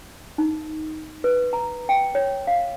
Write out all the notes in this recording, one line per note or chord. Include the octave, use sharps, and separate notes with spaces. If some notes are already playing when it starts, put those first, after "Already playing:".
D#4
B4
A#5
G5
C#5
F5